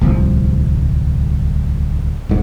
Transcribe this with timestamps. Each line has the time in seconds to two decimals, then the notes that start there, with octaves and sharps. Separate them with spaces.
0.01 D1 G1 C2 F3
2.29 D#1 G#2